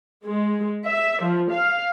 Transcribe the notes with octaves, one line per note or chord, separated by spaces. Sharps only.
G#3
E5
F3
F5